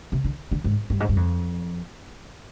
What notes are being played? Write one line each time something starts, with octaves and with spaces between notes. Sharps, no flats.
C3
D3
D3
G#2
G2
G#2
G2
F2